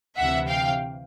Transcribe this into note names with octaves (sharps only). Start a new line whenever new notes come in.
D2 C3 E3 E5 F#5
F5 G5